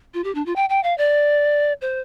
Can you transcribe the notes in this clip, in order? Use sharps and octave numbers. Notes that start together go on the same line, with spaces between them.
F4
G4
D4
F4
G5
G5
F5
D5
C5